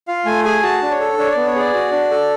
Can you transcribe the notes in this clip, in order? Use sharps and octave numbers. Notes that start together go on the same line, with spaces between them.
F4 F5
A3 G#5
G#4 G#5
F#4 A5
D4
C#5
A4
D4 C#5
B3 D5
C#5
G#4 D5
F#4
D4
A4